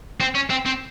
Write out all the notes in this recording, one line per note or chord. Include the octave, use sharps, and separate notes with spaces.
C4
C#4
C4
C4